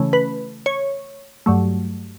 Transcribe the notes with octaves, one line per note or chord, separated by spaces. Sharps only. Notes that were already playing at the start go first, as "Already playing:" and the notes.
Already playing: C#3 E3 A3 C#4
B4
C#5
G2 F#3 A3